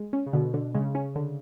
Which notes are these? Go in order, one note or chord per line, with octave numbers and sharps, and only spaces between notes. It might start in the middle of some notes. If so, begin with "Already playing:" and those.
Already playing: G#3
C#4
C#3
B2 D3
D3
C#3 G#3
C#4
D3